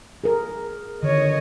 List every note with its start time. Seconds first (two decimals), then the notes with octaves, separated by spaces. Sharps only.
0.24 G#4 A#4
1.03 D3 D#3 C#5 D#5